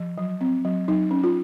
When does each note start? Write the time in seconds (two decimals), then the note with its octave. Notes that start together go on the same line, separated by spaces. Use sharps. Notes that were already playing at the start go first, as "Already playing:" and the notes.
Already playing: F3
0.18 F#3
0.41 C4
0.65 F#3
0.88 F#3 D#4
1.11 C#4
1.24 F4